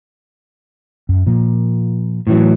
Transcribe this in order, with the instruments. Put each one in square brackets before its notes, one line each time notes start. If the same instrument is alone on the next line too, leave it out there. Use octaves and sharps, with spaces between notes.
[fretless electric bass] F#2
A#2 F3 A#3
[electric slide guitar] A2 E3 F#3